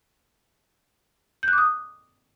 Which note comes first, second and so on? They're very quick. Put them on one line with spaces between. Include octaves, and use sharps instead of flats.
G6 F#6 D6 D#6